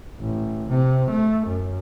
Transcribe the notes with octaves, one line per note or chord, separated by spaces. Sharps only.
A1
C3
A3
F#2